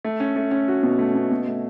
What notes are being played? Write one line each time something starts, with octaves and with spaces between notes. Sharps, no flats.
A3
C#4
A3
C#4
F#4
B2
A3
B2
B2
A3